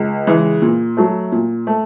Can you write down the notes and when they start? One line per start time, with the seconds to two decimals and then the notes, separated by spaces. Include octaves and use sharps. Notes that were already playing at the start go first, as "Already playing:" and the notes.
Already playing: C#2
0.27 C#3 E3 G#3
0.62 A#2
0.97 F#3 A3
1.32 A#2
1.67 A3